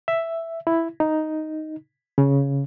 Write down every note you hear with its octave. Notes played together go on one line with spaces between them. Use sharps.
E5
E4
D#4
C#3